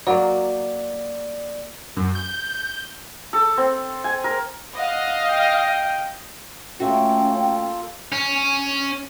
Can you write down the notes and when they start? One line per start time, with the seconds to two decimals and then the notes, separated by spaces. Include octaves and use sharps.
0.07 F#3 A#3 D5
1.96 F#2
2.15 G6
3.33 A4
3.57 C4
4.04 G#5
4.24 A#4
4.79 D#5 F5 F#5
5.29 G5
6.80 A3 A#3 C#4 F4 F#4 A4 G5
8.12 C#4